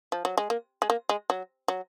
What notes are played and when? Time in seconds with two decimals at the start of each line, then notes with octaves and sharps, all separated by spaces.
0.12 F3
0.25 F#3
0.38 G#3
0.50 A#3
0.82 G#3
0.90 A#3
1.09 G#3
1.30 F#3
1.68 F#3